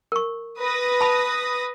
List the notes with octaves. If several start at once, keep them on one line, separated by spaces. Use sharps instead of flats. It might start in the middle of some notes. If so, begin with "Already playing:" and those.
A#4 C#6
B4 D#6 A#6
A5 B5